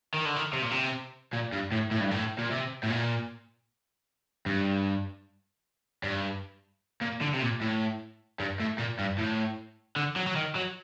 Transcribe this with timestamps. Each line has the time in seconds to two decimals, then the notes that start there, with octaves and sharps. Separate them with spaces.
0.14 D#3
0.25 D3
0.36 D#3
0.53 C3
0.62 A#2
0.71 C3
1.33 A#2
1.52 G2
1.72 A2
1.91 A2
2.01 G2
2.11 A2
2.38 A#2
2.51 C3
2.83 A2
2.90 A#2
4.46 G2
6.03 G2
7.01 A#2
7.21 D3
7.34 C3
7.42 A#2
7.61 A2
8.40 G2
8.60 A2
8.78 A#2
8.99 G2
9.18 A2
9.96 D3
10.16 F#3
10.27 F#3
10.36 D#3
10.56 F#3